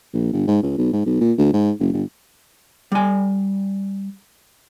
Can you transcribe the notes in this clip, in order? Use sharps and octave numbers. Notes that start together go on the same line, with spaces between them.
A#1
G1
G#2
C#2
B1
G#2
B1
A#2
D2
G#2
F#1
G1
G3 G#5